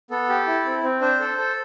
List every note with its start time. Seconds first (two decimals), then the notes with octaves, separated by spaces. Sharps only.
0.10 B3 A4
0.29 G4
0.47 E4
0.65 C4
0.83 C4
1.01 D4 C5
1.20 A4
1.38 A4